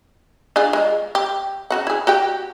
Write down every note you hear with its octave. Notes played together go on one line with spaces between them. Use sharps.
D4 F4 G#4
G#3 F4
G4
C#3 F#4 F#5
E4 G#4
F#4 G4 G5